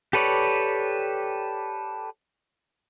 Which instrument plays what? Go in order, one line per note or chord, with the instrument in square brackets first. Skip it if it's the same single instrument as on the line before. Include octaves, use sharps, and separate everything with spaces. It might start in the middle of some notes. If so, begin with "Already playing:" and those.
[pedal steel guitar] G4 A4 B4 C#5 D5